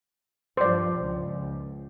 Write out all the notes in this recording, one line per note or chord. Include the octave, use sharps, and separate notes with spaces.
G2 F3 C5 D5
C#2